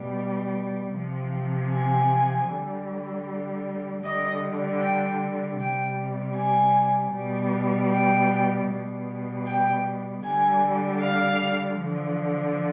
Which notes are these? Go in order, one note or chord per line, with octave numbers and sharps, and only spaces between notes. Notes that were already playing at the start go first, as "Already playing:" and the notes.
Already playing: B2 G3
C3 F3
G#5
D3 G3
D3 G3 D#5
G5
C3 G3 G5
G#5
B2 G3
G5
B2 G3
G5
D3 G3 G#5
F5
D3 F3